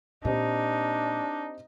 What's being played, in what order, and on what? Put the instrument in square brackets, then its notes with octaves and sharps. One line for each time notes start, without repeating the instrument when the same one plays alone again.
[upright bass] A#2 [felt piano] C4 G4 D#5 [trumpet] D4 [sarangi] D#4